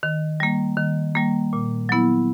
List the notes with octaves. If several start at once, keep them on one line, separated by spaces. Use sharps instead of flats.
D#3
G3 A#3
D#3
G3 A#3
A#2
F#3 B3 E4